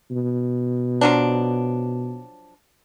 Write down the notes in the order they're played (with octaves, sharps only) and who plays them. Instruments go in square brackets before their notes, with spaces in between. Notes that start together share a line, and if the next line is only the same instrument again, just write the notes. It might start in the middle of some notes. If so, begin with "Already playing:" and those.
[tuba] B2
[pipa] F3 F#3 D4